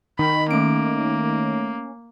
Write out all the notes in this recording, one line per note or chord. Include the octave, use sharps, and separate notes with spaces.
D#3 G5 B5
A3 A#3 C#4 D7